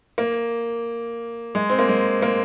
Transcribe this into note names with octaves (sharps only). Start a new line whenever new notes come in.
A#3
G#3
C4
A#3
G#3
A#3